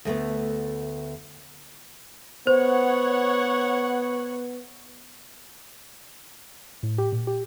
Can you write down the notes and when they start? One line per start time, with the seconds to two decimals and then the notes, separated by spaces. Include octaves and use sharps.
0.05 D2 A3 B3
2.47 B3 C5 C#5 F#5
6.83 A2
6.98 G4
7.12 A#2
7.27 G4